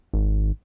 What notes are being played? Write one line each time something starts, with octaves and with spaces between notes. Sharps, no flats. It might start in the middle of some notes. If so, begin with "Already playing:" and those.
G#1